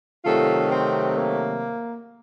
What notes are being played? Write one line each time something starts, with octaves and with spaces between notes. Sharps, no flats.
C3 D#3 F#3 A3 F4 A4
C4
A#3